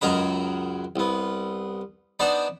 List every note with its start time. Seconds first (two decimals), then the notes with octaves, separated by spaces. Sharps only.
0.01 C#2 F#2 F#3 A#4 D#5 B5
0.96 C2 B3
2.19 B3 D4 D#4 C5 D5 B5